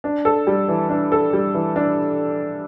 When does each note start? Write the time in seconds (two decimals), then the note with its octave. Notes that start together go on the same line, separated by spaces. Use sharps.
0.04 D4
0.25 A4
0.47 G3
0.69 E3
0.89 D4
1.12 A4
1.33 G3
1.54 E3
1.76 D4